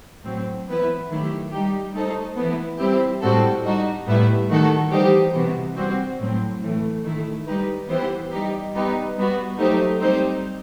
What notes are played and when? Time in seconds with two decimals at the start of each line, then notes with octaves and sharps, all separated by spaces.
0.24 A2 F#3 C4
0.67 E3 B3 E4 B4
1.09 D#3 F#3 A3 E4 G4
1.52 G3 D#4 G4
1.94 A3 D#4 A4 C5
2.37 E3 B3 E4
2.79 G3 C4 E4 G4 C5
3.21 A2 G3 C4 F#4 A4
3.64 G3 D#4 F#4
4.07 A2 G3 B3 E4
4.49 D#3 A3 D#4 F#4 A4
4.92 E3 G3 D#4 G4 C5
5.34 C3 E3 B3 F#4
5.76 G3 C4 F#4
6.19 A2 F#3 C4
6.61 A2 E3 A3
7.04 D#3 A3 E4
7.46 G3 D#4 G4 B4
7.88 E3 B3 E4 G4 C5
8.31 G3 D#4 G4
8.73 G3 B3 D#4 G4
9.17 G3 B3 F#4
9.58 F#3 A3 D#4 G4 C5
10.00 G3 C4 D#4 G4 C5